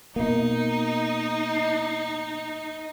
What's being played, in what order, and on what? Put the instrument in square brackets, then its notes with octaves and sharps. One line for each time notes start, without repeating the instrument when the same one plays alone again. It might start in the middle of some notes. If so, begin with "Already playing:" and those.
[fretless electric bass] B2 A#3 [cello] D#4